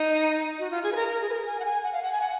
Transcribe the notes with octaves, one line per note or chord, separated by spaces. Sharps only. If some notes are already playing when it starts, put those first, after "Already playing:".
Already playing: D#4
F#4
F4
G#4
B4
A#4
A#4
G#4
B4
A#4
G#5
F#5
G#5
F#5
F5
F#5
G#5
F#5